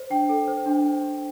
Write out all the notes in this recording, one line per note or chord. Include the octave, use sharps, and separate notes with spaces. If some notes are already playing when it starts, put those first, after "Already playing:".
Already playing: C5
D4 G5
A4
C5
D4